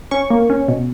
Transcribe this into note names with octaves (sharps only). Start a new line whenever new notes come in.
C#4 C#6
A#3
C#4
B2